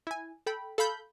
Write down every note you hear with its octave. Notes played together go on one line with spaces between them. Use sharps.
E4 G#5
A4 G5 B5
A4 F5 B5 G6